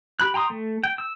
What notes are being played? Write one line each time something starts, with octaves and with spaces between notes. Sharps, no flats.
G4 B5 F#6
G5 A#5 C6 D#6
A3
G5
E6